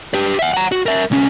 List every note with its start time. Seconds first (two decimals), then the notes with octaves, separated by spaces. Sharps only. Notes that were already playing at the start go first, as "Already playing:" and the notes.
0.14 G4 B4
0.39 E5 F#5
0.54 F#5 A#5
0.72 F#4
0.86 A#4 E5
1.11 C2 C#4